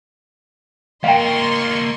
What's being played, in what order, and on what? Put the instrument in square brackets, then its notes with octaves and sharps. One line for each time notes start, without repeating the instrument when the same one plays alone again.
[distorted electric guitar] A#3 F#4 [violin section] D#5 C6 C#6 [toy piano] F5 G5